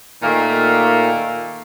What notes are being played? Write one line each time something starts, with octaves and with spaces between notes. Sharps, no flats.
A#2 D#3 A3 A#3